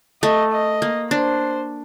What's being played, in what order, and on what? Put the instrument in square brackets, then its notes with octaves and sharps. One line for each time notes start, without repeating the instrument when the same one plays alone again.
[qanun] A3 [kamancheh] D#5
[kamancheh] D#5
[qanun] A#3
[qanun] D4 [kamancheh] C5